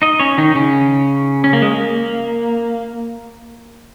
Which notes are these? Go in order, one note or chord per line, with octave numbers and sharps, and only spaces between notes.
D#4 D#5
C#4 C#5
D#3 D#4
C#3 C#4
C#4
A#3
G#3
A#3